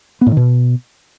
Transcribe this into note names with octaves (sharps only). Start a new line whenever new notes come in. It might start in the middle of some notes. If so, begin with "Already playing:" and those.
B3
A2
D#3
B2